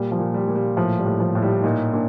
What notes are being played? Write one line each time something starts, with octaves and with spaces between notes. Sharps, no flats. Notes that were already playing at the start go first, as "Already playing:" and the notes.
Already playing: A#2 G3
F3
A#2
G3
A#2
G3
A2 F3
G3
A2
F3
A2
G3
A#2 D#4
A#2 D4